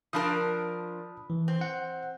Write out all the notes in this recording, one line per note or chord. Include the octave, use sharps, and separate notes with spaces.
F3 D4 A#4 A5 B5 D#6
E3
C4
F#5